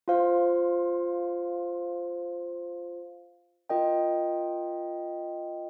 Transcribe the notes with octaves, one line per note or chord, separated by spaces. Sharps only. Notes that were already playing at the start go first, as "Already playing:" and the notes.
F4 C5 F5
F4 A#4 D#5 G5